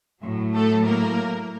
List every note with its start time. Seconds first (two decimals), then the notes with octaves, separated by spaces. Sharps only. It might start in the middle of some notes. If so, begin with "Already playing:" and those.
0.23 A2 F#3
0.54 A3 A4
0.86 A#3 A#4